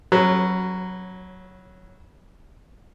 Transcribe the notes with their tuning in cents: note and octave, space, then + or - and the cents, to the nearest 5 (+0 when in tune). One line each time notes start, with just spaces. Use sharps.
F#3 +0 C#4 -25 B4 -30